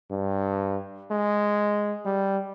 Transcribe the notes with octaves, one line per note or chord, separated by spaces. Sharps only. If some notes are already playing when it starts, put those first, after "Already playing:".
G2
G#3
G3